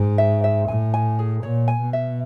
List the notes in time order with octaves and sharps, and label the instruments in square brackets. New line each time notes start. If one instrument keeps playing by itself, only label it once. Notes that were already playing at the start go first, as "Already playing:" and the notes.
Already playing: [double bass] G#2
[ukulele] E5
E5
[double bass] A2 [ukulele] G#5
[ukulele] G#5
G#4
[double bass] A#2 [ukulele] C#5
[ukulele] G#5
[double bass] B2
[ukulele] E5